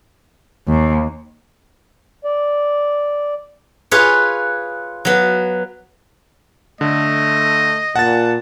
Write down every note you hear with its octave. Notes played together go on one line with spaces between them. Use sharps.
D#2
D5
F4 G#4 B4 C#5
F#3 B3
D3 A3 D#5
A#2 F#5 A5 A6